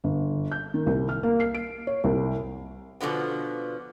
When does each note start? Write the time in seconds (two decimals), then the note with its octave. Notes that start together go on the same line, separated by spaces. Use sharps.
0.04 G1
0.52 G6
0.74 D#3
0.86 C2
1.09 F6
1.23 A#3
1.40 C7
1.55 D7
1.87 C#5
2.04 C2
3.01 B2 D3 F3 B3